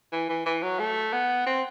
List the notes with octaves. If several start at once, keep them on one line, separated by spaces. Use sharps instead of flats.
E3
E3
E3
F#3
A3
B3
C4